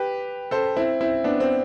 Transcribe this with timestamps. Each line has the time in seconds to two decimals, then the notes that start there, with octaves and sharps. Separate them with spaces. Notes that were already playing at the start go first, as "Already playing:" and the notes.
Already playing: G4 B4
0.51 A4 C5
0.77 C4 E4
1.01 C4 E4
1.24 B3 D4
1.40 C4